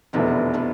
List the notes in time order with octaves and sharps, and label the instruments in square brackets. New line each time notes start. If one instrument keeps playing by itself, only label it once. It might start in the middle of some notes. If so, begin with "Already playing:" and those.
[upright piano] F1 E2 B2 A3 E4 [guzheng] D3 F3
[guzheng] D3 F3